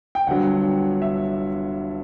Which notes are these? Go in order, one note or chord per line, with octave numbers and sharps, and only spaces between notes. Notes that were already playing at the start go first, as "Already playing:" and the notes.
G5
G1 G2 D3 F#3 F#5
E5